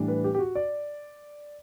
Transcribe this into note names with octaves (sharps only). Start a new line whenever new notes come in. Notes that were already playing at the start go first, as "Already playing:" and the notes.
Already playing: A2 E3 G3 D4
B4
G4
G4
F#4
D5